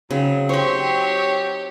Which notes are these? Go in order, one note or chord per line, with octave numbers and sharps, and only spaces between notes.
C#3 F#3 C4 D#4
G4 C5 C#5 G5 C#6